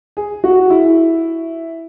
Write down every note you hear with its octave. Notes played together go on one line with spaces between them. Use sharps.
G#4
F#4
E4